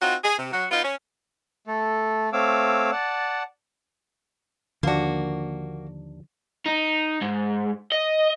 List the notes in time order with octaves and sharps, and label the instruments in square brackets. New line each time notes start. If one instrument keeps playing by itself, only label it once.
[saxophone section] C4 D#4 F4 F#4
G#4
C3
F#3 F#4
B3 D#4 F4
C#4
[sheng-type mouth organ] A3 A4
A3 C4 C#5 F5 D6 E6
D5 F#5 A5
[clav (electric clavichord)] D#2 D4 [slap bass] D3 F3 [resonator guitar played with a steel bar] A#3 F#4
[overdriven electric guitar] D#4
G#2
D#5